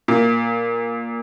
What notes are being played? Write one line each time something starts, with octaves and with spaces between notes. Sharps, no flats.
A#2